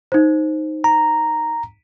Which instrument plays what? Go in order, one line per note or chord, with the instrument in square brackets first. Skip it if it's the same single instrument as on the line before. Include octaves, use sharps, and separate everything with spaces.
[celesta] D#4 C5
[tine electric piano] A#5